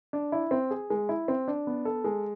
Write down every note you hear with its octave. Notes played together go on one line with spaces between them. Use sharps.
D4
E4
C4
G#4
G#3
E4
C4
D4
B3
A4
G#3